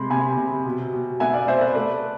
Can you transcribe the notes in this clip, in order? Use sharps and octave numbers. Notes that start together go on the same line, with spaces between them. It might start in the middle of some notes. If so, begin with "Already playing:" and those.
Already playing: C3 G#3 B5 C6
C3 G#5 B5
C3
B2
B2
B3 E5 G#5
D5 F5
B3 C5 E5
B4 D5
A3 B4 D5